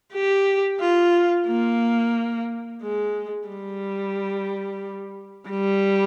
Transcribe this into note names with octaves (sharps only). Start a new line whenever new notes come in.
G4
F4
A#3
G#3
G3
G3